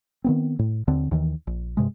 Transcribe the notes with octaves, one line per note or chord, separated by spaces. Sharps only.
D#3 B3 C4
A2
D#2 D3 C4
D#2 D#3 E3
A#1
G2 C3 G#3